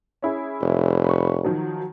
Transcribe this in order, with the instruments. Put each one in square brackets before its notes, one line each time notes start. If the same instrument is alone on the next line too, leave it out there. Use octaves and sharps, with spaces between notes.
[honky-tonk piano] C#4 E4 G#4
[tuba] F1
[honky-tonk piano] B5 C#6
D#3 F3 F#3